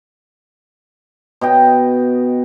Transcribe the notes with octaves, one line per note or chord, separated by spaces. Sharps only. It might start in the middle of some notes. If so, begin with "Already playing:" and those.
B2 D#5 G5